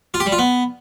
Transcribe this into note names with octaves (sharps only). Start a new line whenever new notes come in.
F4
G4
G3
F4
B3